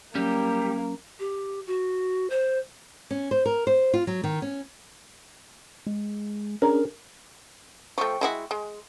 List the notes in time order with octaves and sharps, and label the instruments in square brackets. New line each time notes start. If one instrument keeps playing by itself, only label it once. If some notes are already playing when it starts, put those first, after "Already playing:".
[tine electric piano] F#3 C#4 [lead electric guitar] G3 G4 [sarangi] A#3
[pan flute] G4
F#4
C5
[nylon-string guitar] C#4
C5
A#4
C5
F4
F#3
D#3
C#4
[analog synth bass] G#3
[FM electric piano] C#4 D4 G#4 [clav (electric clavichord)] A#4
[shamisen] F3 A3 [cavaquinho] G5 C#6
[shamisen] G#3 E4 F#4
G#3